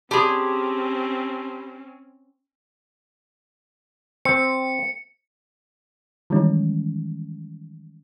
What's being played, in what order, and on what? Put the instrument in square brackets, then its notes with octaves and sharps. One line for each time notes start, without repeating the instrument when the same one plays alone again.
[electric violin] C4 C#4 [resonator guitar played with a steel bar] G4 G#4 [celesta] A5 B5 C6
[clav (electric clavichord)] C4 [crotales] C#7
[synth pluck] D#3 E3 G3 G#3 C#4 D#4